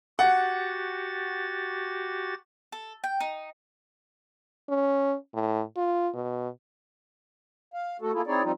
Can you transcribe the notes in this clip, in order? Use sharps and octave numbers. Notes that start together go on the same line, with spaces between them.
F#4 G4 F#5 A6
A4
G5
D#4
C#4
A2
F4
B2
F5
A3 F#4 A4
A#3 E4 F4 G#4 A4
C4 D#4 E4 G#4 C#5 D5
F3 G3 C4 D#4 F4